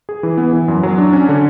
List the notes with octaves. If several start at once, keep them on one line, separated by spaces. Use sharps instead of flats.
G#4
E3
B3
E3
F#2
F#3
D4
C#4
D3